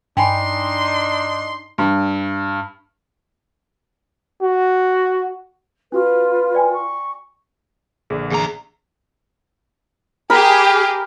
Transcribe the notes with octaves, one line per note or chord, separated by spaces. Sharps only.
G2 D4 D#4 G5 G#5 B5 C6
G2
F#4
C#4 F4 F#4 B4 C#6
D5 G5 G#5
C#6
A#1 D3 G#4
E2 G#4 A#5
G4 G#4 A#4 B5